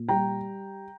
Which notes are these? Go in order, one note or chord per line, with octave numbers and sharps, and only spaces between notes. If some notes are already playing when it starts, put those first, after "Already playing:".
Already playing: A#2
G3 G5 A#5